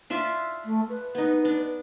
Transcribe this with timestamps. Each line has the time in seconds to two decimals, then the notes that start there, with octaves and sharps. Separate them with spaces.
0.10 D4 F4 E5
0.65 A3
0.89 B4
1.15 B3 D#4
1.45 D4